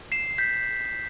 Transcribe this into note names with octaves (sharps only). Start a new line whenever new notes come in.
C7 E7
G6 B6